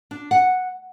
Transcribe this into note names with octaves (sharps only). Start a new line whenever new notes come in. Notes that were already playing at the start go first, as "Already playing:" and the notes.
D4
F#5